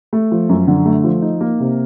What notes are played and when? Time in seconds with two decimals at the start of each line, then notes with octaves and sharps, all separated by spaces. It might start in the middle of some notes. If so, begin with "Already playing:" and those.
0.13 A3
0.32 F3
0.49 F#2
0.68 D3
0.85 A3
1.04 F3
1.22 D#4
1.41 A#3
1.60 C3